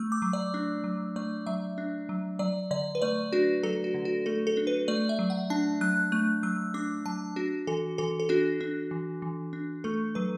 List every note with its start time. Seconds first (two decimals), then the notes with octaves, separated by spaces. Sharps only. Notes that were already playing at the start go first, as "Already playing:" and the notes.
Already playing: A3 E6
0.12 D6
0.22 F#3
0.33 D5
0.54 D4
0.84 F#3
1.16 A3 D5
1.47 F#3 E5
1.78 D4
2.09 F#3
2.39 F#3 D5
2.71 D3 D5
2.95 B4
3.02 A3 D5
3.33 D4 F#4
3.63 F#3 A4
3.84 F#4
3.94 D3
4.05 F#4
4.26 A3 A4
4.47 A4
4.57 D4
4.67 B4
4.88 A3 D5
5.09 E5
5.19 F#3
5.30 F#5
5.50 D4 A5
5.81 F#3 F#6
6.12 A3 F#6
6.43 F#3 E6
6.74 D4 D6
7.06 F#3 A5
7.36 D4 F#4
7.67 E3 A4
7.98 E3 A4
8.20 A4
8.29 D4 F#4
8.61 D4
8.91 E3
9.22 E3
9.53 D4
9.84 A3 A4
10.15 F#3 B4